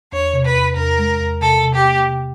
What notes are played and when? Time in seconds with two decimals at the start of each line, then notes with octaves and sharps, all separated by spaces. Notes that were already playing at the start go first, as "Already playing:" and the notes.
0.12 E2 C#5
0.33 C3
0.45 B4
0.55 E2
0.76 E2 A#4
0.98 G#3
1.20 E2
1.41 C3 A4
1.63 C3
1.73 G4
1.84 A#3
2.06 C3